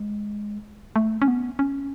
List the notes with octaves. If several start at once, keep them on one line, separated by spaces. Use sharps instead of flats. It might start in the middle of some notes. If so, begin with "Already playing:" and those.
Already playing: G#3
A3
C#4
B3
C#4